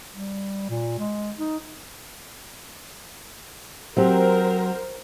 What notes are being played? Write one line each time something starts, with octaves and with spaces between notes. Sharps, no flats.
G3
A#2
G#3
D#4
F#3 C4 G4 A#4 C5